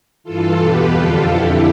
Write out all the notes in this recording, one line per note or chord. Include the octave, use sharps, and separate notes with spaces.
G2 E3 F4 A4
E2 B2 G4 B4
F2 D3 F4 A4
F2 D3 E4 G4